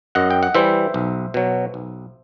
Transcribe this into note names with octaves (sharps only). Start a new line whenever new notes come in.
F#2 D#5 F#5
G5
F#5
E3 G3 C5 E5
B1
B2 F#3
B1